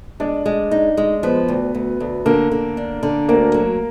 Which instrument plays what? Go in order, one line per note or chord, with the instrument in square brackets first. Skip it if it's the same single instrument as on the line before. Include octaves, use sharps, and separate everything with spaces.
[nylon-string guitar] G#3 [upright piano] D4 D5
[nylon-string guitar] G#3
D#4
G#3
[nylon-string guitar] F3 [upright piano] B3 B4
[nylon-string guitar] D2
D2
D2
[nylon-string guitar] D3 [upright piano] A#3 A#4
[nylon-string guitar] D3
D4
D3
[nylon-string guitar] D2 [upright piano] A#3 A#4
[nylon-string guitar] F#3